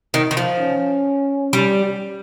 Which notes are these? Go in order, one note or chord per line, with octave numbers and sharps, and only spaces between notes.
D#3
D#3
F3
C#4
G3